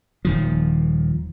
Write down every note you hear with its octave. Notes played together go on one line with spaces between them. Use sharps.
D#1 D#3 F3